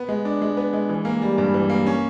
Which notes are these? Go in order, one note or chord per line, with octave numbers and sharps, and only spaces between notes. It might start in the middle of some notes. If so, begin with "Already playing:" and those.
Already playing: B3
G#3
D4
G#3
B3
G#3
E3
A#3
G3
G2
E3
A#3
C#4